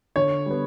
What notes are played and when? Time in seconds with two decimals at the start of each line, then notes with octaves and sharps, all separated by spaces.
0.16 D3 C#5
0.46 G3 B3